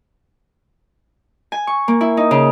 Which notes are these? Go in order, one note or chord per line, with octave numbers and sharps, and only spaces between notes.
G#5
C#6
A#3
E4
D#4
C#3